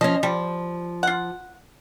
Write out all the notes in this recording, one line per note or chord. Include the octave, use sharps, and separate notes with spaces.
F3 C#4 D#5
F3 G3
F4 F#5